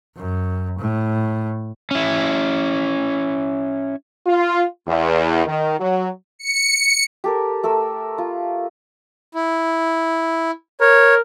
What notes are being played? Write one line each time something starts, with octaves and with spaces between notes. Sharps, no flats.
F#2
A2
C#4 E4
F4
E2
D#3
F#3
C#7
G4 A4 A#4
A3 A4 A#4 E6
F4
E4
A#4 C#5